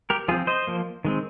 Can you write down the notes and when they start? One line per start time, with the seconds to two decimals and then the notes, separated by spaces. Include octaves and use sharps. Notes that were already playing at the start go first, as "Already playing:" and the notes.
0.10 G4 A#4
0.28 F3 F4 G#4
0.31 C4
0.47 C5 D#5
0.67 F3 A#3
1.05 D#3 G#3 C4